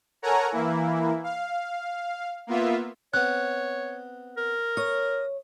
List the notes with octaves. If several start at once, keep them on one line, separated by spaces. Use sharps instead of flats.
A4 A#4 C#5 F#5 G#5 A#5
E3 A#3 E4
F5
A#3 B3 F4 E5
B3 C4 C#5 F#6
A#4
C#5 D#6